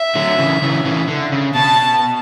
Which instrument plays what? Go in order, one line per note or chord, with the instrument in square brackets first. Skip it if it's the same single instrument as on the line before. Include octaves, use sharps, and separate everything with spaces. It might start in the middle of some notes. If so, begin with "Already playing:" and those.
Already playing: [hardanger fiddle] E5
[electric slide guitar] D3 F#3
C#3 E3
C#3 E3
C#3 E3
D3
C#3
[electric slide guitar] B2 [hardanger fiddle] A5